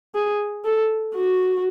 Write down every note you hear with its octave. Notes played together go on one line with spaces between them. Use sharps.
G#4
A4
F#4